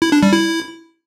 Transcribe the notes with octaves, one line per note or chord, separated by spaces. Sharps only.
E4
D4
G3
E4